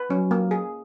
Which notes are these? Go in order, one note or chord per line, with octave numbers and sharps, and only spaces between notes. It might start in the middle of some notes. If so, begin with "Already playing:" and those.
Already playing: B4
F#3 C#4
A#3
G#4